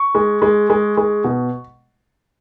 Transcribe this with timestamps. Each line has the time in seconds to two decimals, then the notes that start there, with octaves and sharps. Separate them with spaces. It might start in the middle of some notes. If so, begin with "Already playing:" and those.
Already playing: C#6
0.15 G#3
0.42 G#3
0.70 G#3
0.97 G#3
1.24 B2